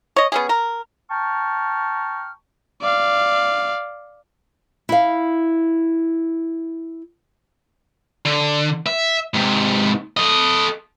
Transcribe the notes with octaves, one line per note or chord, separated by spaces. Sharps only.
C#5 D#5
B3 C#4 G#4
A#4
G5 A5 A#5 C#6 F6
D5 F5
E4 F5
D3
E5
G#2 C3
A4 D#5